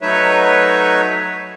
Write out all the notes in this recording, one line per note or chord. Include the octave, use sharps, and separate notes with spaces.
F#3 A3 D#4 B4 C#5 E5